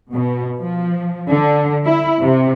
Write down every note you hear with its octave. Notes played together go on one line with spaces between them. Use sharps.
B2
F3
D3
E4
C3